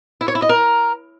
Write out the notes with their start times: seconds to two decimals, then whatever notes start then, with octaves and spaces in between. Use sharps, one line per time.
0.21 E4
0.28 C#5
0.35 E4
0.42 D#5
0.49 A#4